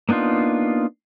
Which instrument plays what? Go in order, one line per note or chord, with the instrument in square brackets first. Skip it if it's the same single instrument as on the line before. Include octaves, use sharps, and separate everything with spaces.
[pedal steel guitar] A#3 B3 D4 D#4 F4